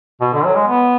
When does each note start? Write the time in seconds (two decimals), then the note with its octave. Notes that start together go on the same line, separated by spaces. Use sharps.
0.21 B2
0.33 D3
0.44 F#3
0.55 G#3
0.67 B3